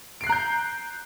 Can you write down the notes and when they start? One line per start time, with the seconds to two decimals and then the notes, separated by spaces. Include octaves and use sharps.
0.21 D7
0.24 C7
0.27 F#6
0.29 A#5
0.32 G6